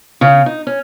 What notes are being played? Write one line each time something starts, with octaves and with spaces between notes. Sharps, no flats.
C#3
D#4
C#4